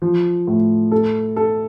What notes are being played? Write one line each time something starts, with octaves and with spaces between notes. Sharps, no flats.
F3
A2
A4
A4